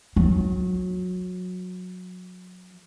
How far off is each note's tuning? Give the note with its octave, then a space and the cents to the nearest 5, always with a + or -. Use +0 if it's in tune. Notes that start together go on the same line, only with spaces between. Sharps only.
F#3 -25